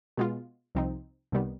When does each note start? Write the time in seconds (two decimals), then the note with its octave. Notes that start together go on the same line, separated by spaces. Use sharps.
0.17 B2 G#3 B3 F4
0.75 C2 C3 F3 C4 D#4
1.32 C2 C3 D#3 G3 B3